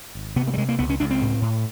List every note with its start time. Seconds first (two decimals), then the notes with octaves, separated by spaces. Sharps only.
0.15 G#1
0.36 C3 B3
0.47 A#3
0.54 G3
0.57 C3 G#3
0.69 A#3
0.79 C#2 B3
0.90 C#4
1.00 C#2 D4
1.10 C4
1.22 A2
1.42 A2